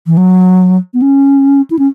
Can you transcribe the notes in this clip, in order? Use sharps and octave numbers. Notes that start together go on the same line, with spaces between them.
E3
F#3
B3
C#4
E4
C#4